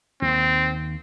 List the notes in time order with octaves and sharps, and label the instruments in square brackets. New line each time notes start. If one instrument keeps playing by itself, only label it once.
[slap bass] D#2 D#3 [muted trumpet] C4